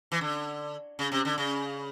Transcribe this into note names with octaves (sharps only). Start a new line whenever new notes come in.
E3
D3
C#3
C3
D3
C#3